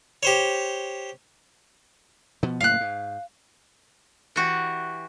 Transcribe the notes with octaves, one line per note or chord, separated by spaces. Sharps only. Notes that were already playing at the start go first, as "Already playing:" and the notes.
G4 C5 C#5
B2 F3 B3
F#1 A2 A#3 F5 F#6
G#2
E3 F#4 G4